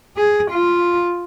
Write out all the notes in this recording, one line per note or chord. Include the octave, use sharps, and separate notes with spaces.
G#4
F4